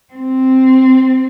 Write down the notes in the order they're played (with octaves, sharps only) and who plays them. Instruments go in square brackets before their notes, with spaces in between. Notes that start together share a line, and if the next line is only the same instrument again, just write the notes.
[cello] C4